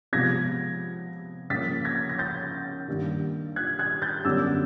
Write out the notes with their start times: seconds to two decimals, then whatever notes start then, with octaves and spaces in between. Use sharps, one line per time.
0.13 C3 F3 G#3 B3 G#6 A#6
1.50 C#3 F3 A#3 A6 B6
1.85 G#6 A#6
2.09 A#6
2.19 G6 A6
2.88 G2 D#3 G3 A#3
3.56 F#6 G#6
3.79 F#6 G#6
4.02 G6 A6
4.25 F#2 D3 G3 B3 D6 E6